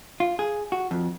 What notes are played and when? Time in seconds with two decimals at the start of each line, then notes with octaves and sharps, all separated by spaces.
0.20 F4
0.39 G#4
0.72 F#4
0.91 F2